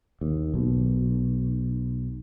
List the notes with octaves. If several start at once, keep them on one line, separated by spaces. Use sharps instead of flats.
D#2
B1